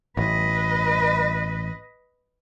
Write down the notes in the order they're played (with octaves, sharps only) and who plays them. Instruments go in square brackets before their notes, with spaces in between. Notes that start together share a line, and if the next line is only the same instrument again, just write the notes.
[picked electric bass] A1 [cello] B4 D#5